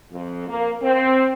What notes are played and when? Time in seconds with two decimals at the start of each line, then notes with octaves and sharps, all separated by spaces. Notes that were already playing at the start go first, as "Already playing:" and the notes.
0.11 F2
0.48 A#3
0.83 C4